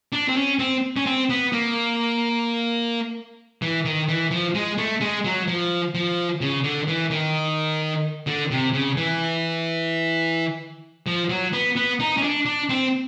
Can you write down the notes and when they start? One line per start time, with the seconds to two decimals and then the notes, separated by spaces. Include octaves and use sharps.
0.13 D4
0.28 C4
0.36 C#4
0.59 C4
0.97 C#4
1.06 C4
1.30 B3
1.52 A#3
3.62 E3
3.85 D#3
4.09 E3
4.31 F3
4.55 G#3
4.78 A3
5.01 G#3
5.25 F#3
5.48 F3
5.95 F3
6.41 C#3
6.64 D3
6.88 E3
7.11 D#3
8.27 D3
8.51 C3
8.74 C#3
8.97 E3
11.07 F3
11.29 F#3
11.53 B3
11.76 B3
12.00 D#4
12.17 C#4
12.23 D4
12.46 D4
12.69 C4